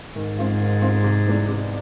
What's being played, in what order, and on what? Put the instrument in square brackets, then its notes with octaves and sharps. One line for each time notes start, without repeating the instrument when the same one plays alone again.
[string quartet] G#2 [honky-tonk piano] D#3
[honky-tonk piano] G#3 C4 F4
D#3
G#3 C4 F4
C3
E3 G#3 B3 D4
C3